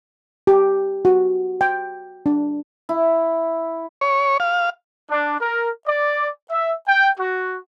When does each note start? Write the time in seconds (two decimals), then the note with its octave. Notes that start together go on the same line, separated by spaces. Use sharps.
0.47 G4
1.05 F#4
1.61 G5
2.26 D4
2.89 E4
4.01 C#5
4.40 F5
5.10 D4
5.41 A#4
5.87 D5
6.51 E5
6.88 G5
7.19 F#4